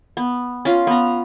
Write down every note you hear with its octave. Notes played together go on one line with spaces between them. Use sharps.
B3
C#4 F4
B3 A#5